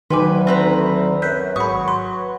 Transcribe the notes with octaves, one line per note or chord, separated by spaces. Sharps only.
D2 D#3 F#3 B4 G5 G#5 C6 D6
C4 B4 A#5
F#2 A#4 B4 E5 F#6 G6 B6
G#1 F#3 G#4 B5 C#6 D#6
B4 C6